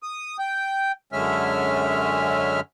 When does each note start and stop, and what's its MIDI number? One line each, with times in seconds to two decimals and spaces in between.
0.03 0.37 87
0.39 0.92 79
1.13 2.60 42
1.13 2.60 50
1.13 2.60 56
1.13 2.60 61
1.13 2.60 76
1.13 2.60 89